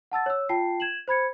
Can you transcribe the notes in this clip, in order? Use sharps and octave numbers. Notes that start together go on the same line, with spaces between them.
F#5 A5 E6 A6
C#5 E6
F4 G5 A5 C7
G#6 E7 F#7
C5 B5 G#6 C#7